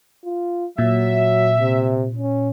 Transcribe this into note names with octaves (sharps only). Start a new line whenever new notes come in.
F4
A#2 F#3 E5
C3
C#4